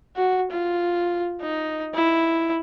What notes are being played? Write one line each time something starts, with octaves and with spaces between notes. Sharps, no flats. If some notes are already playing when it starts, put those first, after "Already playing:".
F#4
F4
D#4
E4